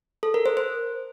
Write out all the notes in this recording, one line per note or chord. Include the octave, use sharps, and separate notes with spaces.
A4
A#4
C5
C5